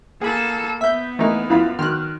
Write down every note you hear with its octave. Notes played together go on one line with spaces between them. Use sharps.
A#3 G#4 A4 F#5 B5
B3 E5 G6 B6
E3 A3 A#3 D#4
F#2 E4 F4 F5 B5
D#3 F#3 C6 F6 F#6